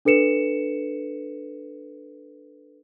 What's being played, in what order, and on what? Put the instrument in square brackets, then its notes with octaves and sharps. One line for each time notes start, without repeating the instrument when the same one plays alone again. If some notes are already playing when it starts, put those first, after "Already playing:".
[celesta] D4 A4 B4 C#7 E7